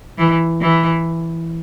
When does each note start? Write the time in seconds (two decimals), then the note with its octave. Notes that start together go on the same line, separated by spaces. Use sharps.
0.18 E3
0.61 E3